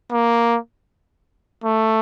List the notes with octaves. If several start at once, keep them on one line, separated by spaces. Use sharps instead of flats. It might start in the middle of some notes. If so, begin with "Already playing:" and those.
A#3
A3